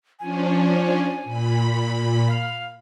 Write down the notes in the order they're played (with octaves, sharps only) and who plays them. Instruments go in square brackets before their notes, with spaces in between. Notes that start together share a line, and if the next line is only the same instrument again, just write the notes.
[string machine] F3 C#4 D4 [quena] G#5
[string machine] A#2 B5
[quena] F5